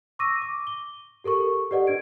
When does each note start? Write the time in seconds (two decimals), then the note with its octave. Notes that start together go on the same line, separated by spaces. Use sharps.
0.19 C#6 D6 E6 A#6 D#7
0.42 D6
0.67 G7
1.24 G4 A4 A#4 C#6
1.71 G4 B4 D5 D#5 F#5
1.87 D4 B4 G#6 D7